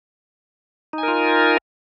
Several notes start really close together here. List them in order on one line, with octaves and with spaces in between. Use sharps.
D#4 G#5 A#4 F4